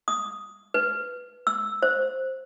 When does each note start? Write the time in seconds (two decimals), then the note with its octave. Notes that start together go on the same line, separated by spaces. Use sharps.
0.08 D#6
0.74 B4
1.47 E6
1.82 C5